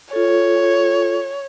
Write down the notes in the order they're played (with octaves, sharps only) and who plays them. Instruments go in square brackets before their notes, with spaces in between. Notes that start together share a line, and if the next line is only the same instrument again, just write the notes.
[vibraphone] F4 A4 [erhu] C#5